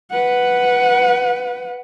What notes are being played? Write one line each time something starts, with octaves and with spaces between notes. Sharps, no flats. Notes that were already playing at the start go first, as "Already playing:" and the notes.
B4 F#5